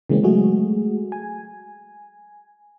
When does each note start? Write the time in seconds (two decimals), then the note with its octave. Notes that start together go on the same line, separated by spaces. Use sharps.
0.10 C#3 E3 G#3 A#3 C4 C#4
0.24 F#3 G#3 A3 F#4 G#4
1.12 G#5